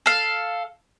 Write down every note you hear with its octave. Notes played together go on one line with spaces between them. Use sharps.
A4 F5